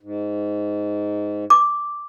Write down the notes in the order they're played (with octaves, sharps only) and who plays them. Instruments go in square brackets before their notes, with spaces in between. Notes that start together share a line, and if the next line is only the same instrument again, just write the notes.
[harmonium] G#2
[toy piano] D6